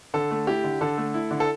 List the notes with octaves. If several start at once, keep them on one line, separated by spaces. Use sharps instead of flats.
D3 A4
A3
E4 G4
D3
D3 A4
A3
E4
D3
A4